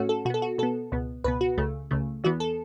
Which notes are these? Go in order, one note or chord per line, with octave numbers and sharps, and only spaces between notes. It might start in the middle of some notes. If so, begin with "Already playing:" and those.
Already playing: A2 A3 C#4 F#4
A4
B2 B3 F#4 A4
F#4
B2 B3 A4
C#2 B2 B3
C#2 B2 B3 B4
F#4
C#2 C#3 A3
C#2 C#3 A3
E2 E3 B3 F#4
A4